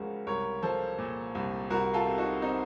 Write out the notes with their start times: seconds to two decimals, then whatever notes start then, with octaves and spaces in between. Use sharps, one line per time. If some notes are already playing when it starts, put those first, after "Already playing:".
Already playing: C#2 C#3 F3 F#4 A#4
0.27 C2 A#4 C#5
0.62 F3 A4 C5
0.99 A#2
1.35 C2
1.70 C2 F#4 A#4
1.93 F4 A4
2.06 C3
2.18 D#4 F#4
2.42 C4 D#4